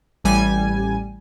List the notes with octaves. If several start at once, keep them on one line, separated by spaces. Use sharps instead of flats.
A1 G3 G#5